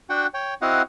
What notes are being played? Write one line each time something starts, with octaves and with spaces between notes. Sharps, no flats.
D4 F#4 F#5 G5
C#5 G5
C4 E4 F#4 D#5 F5 F#5